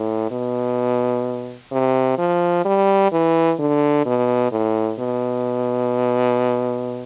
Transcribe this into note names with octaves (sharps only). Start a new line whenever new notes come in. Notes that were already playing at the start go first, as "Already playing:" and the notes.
Already playing: A2
B2
C3
F3
G3
E3
D3
B2
A2
B2